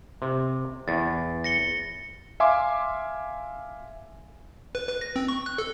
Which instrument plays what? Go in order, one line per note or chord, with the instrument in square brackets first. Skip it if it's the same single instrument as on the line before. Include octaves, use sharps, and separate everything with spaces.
[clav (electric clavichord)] C3
[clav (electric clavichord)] E2 [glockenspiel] A6
[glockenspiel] A#6 C#7 G7
[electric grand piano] E5 F5 G#5 C6 D6
[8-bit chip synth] B4
B4
A#6
C4
C#6
F#6
A4